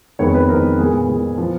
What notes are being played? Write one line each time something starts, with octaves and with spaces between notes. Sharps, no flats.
F2 D#3 G#3 B3 C#5
B4
F2 D#3 G#3 B3 A#4
A#2 G#3 B3 G#4
A#2 G#3 B3
F3 B3